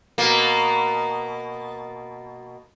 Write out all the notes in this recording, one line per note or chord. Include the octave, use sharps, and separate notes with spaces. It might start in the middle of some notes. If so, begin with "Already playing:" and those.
B2 A#3